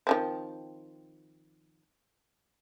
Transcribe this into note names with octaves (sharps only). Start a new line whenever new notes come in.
D#3 F3 C4